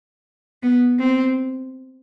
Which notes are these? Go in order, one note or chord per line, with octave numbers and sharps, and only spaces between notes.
B3
C4